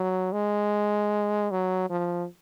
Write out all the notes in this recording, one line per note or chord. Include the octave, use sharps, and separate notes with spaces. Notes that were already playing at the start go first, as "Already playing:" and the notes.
Already playing: F#3
G#3
F#3
F3